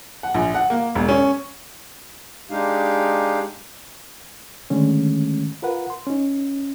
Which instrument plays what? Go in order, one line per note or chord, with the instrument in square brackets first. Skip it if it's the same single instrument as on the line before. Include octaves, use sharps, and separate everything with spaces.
[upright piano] F#5
A#1
F#5
A#3
E1
C#4
[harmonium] G#3 D4 D#4 G4 F5
[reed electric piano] D3 D#3 G#3 A3 C#4
F4 A#4 B4 F#5
C6
C#4 D#4